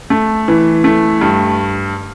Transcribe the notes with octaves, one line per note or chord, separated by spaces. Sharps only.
A3
E3
A3
G2